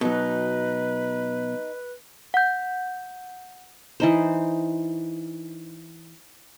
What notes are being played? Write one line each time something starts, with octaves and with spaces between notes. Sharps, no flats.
B2 F#3 D#4 B4
F#5 G6
E3 D#4 C5